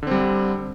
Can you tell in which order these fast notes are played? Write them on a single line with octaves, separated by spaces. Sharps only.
D3 C4 G3